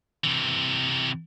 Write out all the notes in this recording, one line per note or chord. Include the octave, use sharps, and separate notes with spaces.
C3 E3